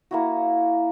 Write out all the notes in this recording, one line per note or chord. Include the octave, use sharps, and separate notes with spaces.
A#3 E4 F#4